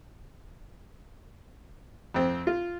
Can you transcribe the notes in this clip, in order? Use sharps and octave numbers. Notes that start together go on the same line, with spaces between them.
F2 C4
F4